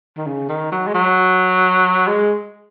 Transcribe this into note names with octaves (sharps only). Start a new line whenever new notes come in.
D#3
C#3
D#3
F#3
G#3
F#3
G#3